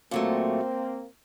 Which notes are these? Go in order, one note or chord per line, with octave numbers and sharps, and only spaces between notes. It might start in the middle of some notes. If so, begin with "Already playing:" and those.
A#2 F#3 A3 A#3 C4